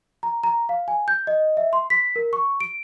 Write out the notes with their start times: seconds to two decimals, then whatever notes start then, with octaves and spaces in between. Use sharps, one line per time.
0.23 A#5
0.44 A#5
0.69 F5
0.88 G#5
1.08 G6
1.27 D#5
1.57 E5
1.73 C6
1.90 B6
2.16 A#4
2.33 C#6
2.61 D7